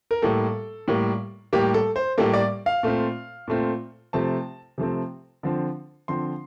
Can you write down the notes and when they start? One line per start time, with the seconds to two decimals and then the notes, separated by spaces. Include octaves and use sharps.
0.11 A#4
0.22 A2 G3 A#3 A4
0.88 A2 G3 A#3
1.53 A2 G3 A#3 G4
1.74 A4
1.96 C5
2.18 A2 G3 A#3 A4
2.33 D5
2.66 F5
2.83 A#2 A3 C4
3.48 A#2 A3 C4
4.13 C3 F3 A3 C4 A5
4.78 C3 F3 A3 C4
5.43 D3 F3 C4
6.08 D3 F3 C4 C6